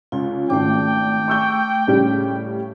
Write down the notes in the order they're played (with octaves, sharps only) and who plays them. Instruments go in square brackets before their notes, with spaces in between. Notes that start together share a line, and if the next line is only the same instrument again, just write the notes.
[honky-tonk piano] C#2 [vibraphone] F4
[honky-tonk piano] G#1 C#3 [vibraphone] A3 D6 [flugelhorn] G5
[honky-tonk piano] C#6 E6 G6
A2 C#3 G3